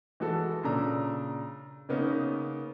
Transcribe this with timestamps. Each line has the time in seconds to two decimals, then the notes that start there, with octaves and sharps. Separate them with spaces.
0.20 E3 G#3 F#4 A4
0.63 A#2 C#3 D4 A#5 E6
1.89 C#3 A#3 B3 C#4 D#4